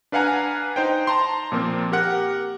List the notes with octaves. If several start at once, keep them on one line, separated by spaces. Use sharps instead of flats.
D4 B4 F5 F#5 G#5 A#5
D#4 C5 G5
A5 A#5 C6
A#2 F3 A#3 C4
G4 A#4 F#5